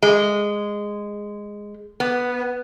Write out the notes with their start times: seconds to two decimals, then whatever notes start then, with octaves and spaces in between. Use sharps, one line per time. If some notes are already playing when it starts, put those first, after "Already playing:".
0.03 G#3
2.00 B3